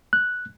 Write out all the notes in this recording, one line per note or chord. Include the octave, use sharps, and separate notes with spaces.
F#6